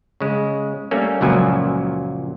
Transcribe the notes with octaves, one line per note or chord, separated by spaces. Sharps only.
C#3 G#3
G3 A3 A#3 C#4
C#2 F#2 A#2 F3 F#3 G#5